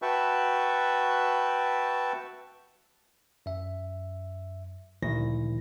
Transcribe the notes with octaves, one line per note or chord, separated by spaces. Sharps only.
F#4 B4 E5 G5 A5 C#6
F#2 E5
D2 A#2 D#3 F3 E4 A#6